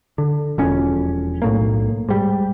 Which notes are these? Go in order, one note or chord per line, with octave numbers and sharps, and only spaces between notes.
D3
E1 F2 C#4
B1 A2 A#3
G#2 G3